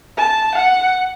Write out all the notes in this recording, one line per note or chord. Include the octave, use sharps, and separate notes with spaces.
A5
F#5